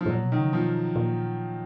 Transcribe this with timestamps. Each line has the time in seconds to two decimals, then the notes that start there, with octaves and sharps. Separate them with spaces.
0.01 F3
0.06 G#2
0.10 A#2 F#3
0.24 B2
0.32 D#3
0.38 C#3
0.53 B2 F3
0.96 A#2